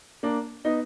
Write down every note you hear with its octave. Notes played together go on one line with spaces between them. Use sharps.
A#3 D4
B3 D#4